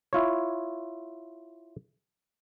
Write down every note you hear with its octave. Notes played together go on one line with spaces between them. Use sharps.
E4 F4 C#5